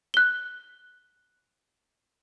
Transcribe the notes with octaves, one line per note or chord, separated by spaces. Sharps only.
F#6 G7